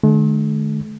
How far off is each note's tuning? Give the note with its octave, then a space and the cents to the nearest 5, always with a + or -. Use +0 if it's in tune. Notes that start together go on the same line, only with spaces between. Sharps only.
D3 +40 A3 -45